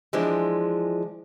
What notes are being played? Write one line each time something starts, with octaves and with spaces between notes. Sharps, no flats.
E3 F3 G#3 D4